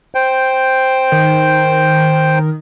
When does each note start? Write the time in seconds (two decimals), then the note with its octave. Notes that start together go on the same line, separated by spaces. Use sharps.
0.15 C5 G5
1.12 D#3